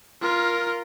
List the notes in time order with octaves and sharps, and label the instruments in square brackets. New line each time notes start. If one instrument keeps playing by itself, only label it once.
[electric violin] F4 A#4